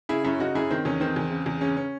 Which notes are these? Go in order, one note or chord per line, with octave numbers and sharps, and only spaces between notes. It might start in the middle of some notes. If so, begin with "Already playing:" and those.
C#3 E4 G#4
F#2 C#4 E4
C#3 D#4 F#4
F#2 E4 G#4
D#3 C4
E2 C#4
D#3 C4
E2
C#3
E2
C#3 C#4
C#4